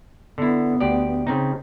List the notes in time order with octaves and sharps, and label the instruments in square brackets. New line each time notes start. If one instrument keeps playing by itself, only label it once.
[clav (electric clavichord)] D3 E4 [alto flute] B3
[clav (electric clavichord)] D2 G4 D5
C#3 C4 D#4